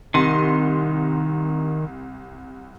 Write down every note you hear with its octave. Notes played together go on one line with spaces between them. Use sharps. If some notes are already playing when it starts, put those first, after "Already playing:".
C2 D#3 C6 D#7